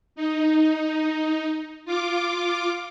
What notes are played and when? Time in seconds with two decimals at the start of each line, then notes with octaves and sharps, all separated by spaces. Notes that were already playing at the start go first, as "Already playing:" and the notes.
0.16 D#4
1.85 F4 D6